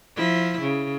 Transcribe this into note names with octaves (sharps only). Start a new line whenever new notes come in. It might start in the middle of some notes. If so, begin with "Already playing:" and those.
F3 E4
C#3